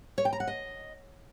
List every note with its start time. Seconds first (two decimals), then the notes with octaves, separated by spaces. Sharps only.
0.18 C#5
0.25 G5
0.33 A#5
0.40 F#5
0.48 D#5